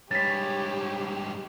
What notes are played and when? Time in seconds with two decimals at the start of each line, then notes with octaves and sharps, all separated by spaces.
0.11 G2 G#3 G4 C#5 A6 B6